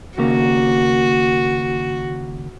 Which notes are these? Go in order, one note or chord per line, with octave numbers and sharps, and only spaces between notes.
D#2 C#3 A#3 F#4